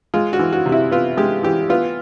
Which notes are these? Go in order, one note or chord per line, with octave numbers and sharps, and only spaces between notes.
G#3 F4
F#4
E3
F#4
C3
E4
B3 F4
G#3 G4
E3 G4
B3 F4